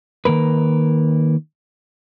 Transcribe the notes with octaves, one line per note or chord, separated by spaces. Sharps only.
D#3 A#3 A#4 B4